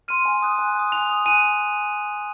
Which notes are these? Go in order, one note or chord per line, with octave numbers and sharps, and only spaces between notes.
C6 F6 D#7
G#5
D#6 F#6
G#5
D#6 F#6
G#5 F7
D#6 F#6
G#5 D#7